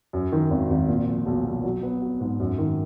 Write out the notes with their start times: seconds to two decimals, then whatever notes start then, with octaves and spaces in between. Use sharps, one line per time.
0.13 F#2
0.32 D#3
0.51 G#1
0.70 G#1
0.89 A#2
1.08 F3
1.26 B1
1.45 B1
1.64 F#3
1.83 B3
2.02 F#4
2.20 G#2
2.40 F#2
2.58 D#3